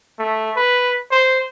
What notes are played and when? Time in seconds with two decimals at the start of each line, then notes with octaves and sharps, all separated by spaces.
0.19 A3
0.56 B4
1.11 C5